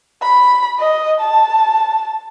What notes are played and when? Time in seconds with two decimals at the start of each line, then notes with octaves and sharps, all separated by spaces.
0.23 B5
0.79 D#5
1.20 A5